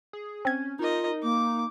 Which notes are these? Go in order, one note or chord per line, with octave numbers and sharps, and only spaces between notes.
G#4
C4 C#4 G#6
D#4 F4 A#4 D#5
A#3 D6